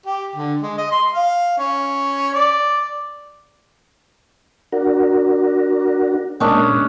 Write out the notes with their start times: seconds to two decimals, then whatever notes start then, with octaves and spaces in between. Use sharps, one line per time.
0.06 G4
0.35 D3
0.62 G#3
0.77 D#5
0.91 C6
1.12 F5
1.58 C#4
2.34 D5
4.73 D4 F#4 A#4
6.40 A#2 G#3 A#3 C#4 D4